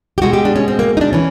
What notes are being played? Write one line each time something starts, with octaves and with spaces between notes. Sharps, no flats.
G4
B2 G#3 F#4
G4
D4
C#4
C4
A#3
D#4
D4
E3 C#4